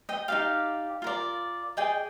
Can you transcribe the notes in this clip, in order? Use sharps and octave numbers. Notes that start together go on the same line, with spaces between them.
D#5 G5
D#4 G4 D5 F5
F4 A#4 D5
G#4 D5 D#5 G5